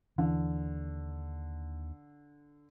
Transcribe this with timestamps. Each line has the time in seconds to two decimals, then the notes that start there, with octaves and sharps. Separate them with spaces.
0.18 D#2 D3 E3